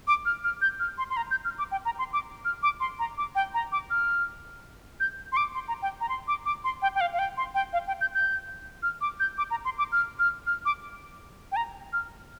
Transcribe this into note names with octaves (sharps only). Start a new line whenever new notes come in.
D6
F6
F6
G6
F6
C6
C6
A#5
G6
F6
D6
G5
A#5
C6
D6
F6
D6
C6
A#5
D6
G5
A#5
D6
F6
G6
C6
D6
C6
A#5
G5
A#5
C6
D6
D6
C6
G5
G5
F5
F5
G5
C6
G5
F5
G5
G6
G6
F6
D6
G6
D6
A#5
C6
D6
F6
F6
F6
D6
G5
A#5
F6